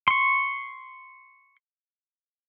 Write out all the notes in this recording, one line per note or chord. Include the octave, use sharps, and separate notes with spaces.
C6 C#6